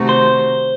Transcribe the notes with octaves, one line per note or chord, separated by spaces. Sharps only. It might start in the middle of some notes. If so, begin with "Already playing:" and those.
Already playing: C3 D#3 A3 D#4 F#4
C5